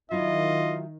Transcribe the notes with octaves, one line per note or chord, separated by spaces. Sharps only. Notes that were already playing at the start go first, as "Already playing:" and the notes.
D#3 F#3 E4 F4 D#5